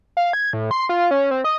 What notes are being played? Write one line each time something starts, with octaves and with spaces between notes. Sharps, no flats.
F5
G#6
A2
C6
F4
C#4
C4
D#5